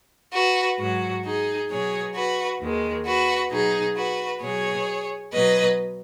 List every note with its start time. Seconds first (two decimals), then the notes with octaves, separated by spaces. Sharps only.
0.34 F#4 B4
0.80 G#2 F#3 F#4
1.25 D#4 G#4
1.70 B2 F#3 G#4 C#5
2.15 F#4 B4
2.60 D#2 D#3 G#3
3.06 F#4 B4
3.51 B2 F#3 D#4 G#4
3.96 F#4 B4
4.41 B2 F#3 G#4 C#5
5.32 B2 F#3 B4 D#5